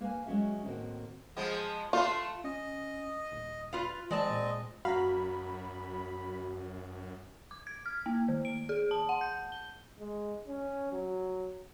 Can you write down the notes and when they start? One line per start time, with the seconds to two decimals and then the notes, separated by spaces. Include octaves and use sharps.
0.01 A#3 B4 E5 F5 G#5
0.26 F#3 G#3 C#4 F#4 E5
0.65 A2 D#3 A#3 C4 F#4 G5
1.37 F3 G#3 B3
1.93 A3 F4 B4 C6
2.44 C#4 D#5
3.32 D#1
3.73 F4 B4 F5
4.11 E3 G#3 C4 D5 D#5 A5
4.30 A#2
4.85 F#2 F#4 F5 A#5 B5
7.51 D6
7.67 G#6
7.86 F6
8.06 A#3
8.28 D#3
8.45 D7
8.69 G#4
8.91 A5
9.09 F#5
9.21 G6
9.52 G7
9.99 G#3
10.48 C#4
10.92 F#3